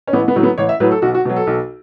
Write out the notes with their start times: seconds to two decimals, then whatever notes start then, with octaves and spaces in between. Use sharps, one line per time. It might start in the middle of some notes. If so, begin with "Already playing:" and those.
0.07 C#4
0.13 A1 B3
0.28 B3
0.36 A2 F#3
0.43 B3
0.58 A1 C#5
0.69 E5
0.80 A2 F#3 B4
0.92 A4
1.02 B1 F#4
1.14 F#4
1.25 B2 F#3
1.36 A4
1.47 B1